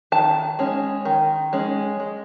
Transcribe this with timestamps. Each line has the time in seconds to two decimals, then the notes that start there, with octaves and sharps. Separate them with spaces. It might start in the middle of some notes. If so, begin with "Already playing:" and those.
0.12 D#3 A5
0.59 G#3 C#4
1.05 D#3
1.53 G#3 C#4
1.99 G#3